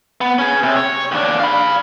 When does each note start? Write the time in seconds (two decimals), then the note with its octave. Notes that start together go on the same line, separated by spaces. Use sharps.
0.21 B3
0.39 C#4 G#4
0.63 C3
0.76 C#5
1.12 D#2 D4
1.40 F5 B5